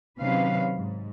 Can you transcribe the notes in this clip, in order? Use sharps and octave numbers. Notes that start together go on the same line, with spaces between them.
C3 D#3 F#3 C#4 B4 F5
G#2